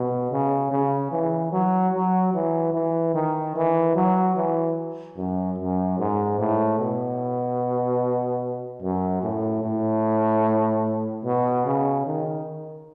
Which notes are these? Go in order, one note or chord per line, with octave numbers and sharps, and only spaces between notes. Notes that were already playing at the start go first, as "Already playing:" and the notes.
Already playing: B2
C#3
C#3
E3
F#3
F#3
E3
E3
D#3
E3
F#3
E3
F#2
F#2
G#2
A2
B2
F#2
A2
A2
B2
C#3
D#3